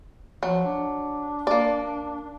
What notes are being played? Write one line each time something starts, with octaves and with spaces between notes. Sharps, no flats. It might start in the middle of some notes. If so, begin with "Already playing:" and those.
F3 F#3
D4
A#3 D5